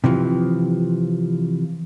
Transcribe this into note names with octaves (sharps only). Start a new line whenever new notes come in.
C3 E3 F3